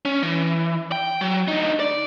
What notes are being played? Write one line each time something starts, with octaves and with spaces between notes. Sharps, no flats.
C#4
E3
G5
F#3
D2 D#4
D5